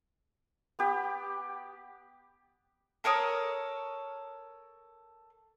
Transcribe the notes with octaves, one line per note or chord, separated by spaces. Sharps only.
B3 G4
A4 A#4 C#5 D#6